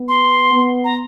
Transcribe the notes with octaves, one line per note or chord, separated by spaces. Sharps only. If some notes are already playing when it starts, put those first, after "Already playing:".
Already playing: B3
C6
B3
A#5